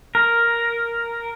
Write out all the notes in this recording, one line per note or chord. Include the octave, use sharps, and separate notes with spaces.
A#4